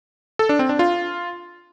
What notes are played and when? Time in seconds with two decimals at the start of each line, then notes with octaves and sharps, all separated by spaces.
0.39 A4
0.49 D4
0.59 C4
0.69 D4
0.79 F4